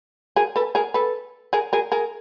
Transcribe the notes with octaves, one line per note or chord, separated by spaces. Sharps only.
G#4 A#4
A4 B4
G#4 A#4
A4 B4
G#4 A#4
G#4 A#4
G#4 A#4